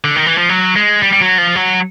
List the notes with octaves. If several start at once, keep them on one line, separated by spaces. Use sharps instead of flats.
D3
D#3
E3
F3
F#3
G#3
G3
G3
F#3
F3
F#3